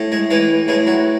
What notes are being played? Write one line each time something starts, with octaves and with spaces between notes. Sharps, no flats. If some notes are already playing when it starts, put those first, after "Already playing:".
Already playing: A2
G#3
E3 G#3
A2 G#3
F#3